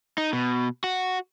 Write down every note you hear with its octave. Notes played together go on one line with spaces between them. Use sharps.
D#4
B2
F#4